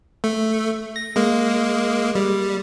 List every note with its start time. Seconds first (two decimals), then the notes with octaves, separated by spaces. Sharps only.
0.24 A3
0.96 A#6
1.16 G#3 A#3
2.15 G3